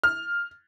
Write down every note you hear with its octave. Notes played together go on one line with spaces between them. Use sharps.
F6